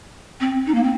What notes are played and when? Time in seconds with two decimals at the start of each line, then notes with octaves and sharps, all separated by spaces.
0.40 C4
0.66 D#4
0.74 A#3
0.83 C4